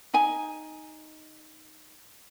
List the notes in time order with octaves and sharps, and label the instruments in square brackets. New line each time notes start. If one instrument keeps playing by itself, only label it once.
[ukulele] D#4 G#5